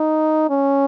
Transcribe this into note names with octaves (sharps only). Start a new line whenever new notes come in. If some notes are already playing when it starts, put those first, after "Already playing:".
Already playing: D#4
C#4